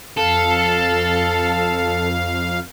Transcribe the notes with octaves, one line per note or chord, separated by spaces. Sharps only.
F2 A4 F5